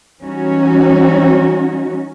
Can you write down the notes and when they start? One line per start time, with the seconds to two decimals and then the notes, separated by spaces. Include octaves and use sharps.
0.20 E3 F#3 G3 C#4 D#4 F#4